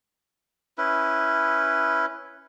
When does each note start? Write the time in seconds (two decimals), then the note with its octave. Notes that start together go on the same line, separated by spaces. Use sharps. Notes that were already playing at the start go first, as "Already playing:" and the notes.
0.78 C#4 E4 B4